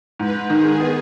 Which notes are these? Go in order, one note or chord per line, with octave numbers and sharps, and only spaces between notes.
G#2 B4
D#3 G#4
B3